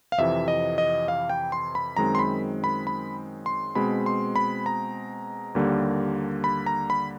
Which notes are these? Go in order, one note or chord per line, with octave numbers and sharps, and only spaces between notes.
F5
F2 C3 E3 E5
D#5
D#5
F5
G5
C6
B5
F#2 D#3 G#3 C4 A#5
C6
B5
B5
B5
C6
B2 G#3 C4 B5
C6
B5
A#5
D#2 D3 G3 A#3
B5
A#5
B5